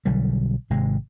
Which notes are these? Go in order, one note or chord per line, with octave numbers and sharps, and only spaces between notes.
B1 D3 F#3 G3
G#1 C3 G#3